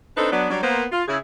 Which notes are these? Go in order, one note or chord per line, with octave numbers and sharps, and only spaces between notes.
C4 D4 D#4 A4 B4 C5
F#3 B3 D4
F#3 G3 D4
A#3 B3 C5
F4
C#3 E4 G#4